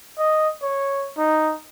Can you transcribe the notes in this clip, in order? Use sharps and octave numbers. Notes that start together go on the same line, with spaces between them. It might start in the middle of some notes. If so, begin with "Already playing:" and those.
D#5
C#5
D#4